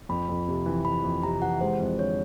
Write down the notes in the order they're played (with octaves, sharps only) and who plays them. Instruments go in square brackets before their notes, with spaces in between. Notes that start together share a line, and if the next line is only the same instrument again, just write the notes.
[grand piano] F2 [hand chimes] B5
[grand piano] F2
C3
E3
[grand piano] F2 [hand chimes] B5
[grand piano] F2
[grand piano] C3 [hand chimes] A#5
[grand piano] E3 [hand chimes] F#5
[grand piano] G#3 [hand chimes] C5
[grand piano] F2
[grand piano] D3 [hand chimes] C#5